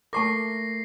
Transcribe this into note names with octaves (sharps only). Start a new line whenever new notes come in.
A3 A#4 A5 C#6 D6 A#6 C7